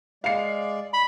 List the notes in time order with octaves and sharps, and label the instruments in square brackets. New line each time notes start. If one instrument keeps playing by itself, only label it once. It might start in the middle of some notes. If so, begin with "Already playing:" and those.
[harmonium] G#3 D5 [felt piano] F5 C7
[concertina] B5